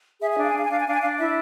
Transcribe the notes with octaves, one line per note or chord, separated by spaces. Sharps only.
G#4 E5
E5
D4
F5
G#5
D4 F5
G#5
D4 F5
G#5
D4 F5
G#5
D4 F5
E4 E5